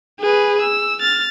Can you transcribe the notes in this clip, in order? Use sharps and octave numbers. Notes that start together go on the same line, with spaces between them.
G#4 B4
E6
F6 A6